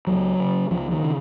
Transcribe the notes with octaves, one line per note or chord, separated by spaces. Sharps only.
C#2 F#3
C#3
C#2 F3
D#3
C#3